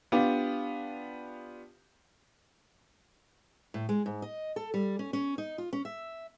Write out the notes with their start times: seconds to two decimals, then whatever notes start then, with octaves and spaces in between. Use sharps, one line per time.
0.12 B3 D4 F4 G4
3.74 A2
3.89 G#3
4.06 G#2
4.22 D#5
4.56 A4
4.74 G3
4.99 C#4
5.13 C#4
5.38 D#4
5.58 F4
5.73 C#4
5.85 E5